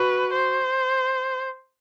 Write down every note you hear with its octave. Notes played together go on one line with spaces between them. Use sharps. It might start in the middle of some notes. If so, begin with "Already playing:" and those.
Already playing: F#4 B4
C5